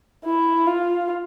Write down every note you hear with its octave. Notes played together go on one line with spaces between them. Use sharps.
E4
F4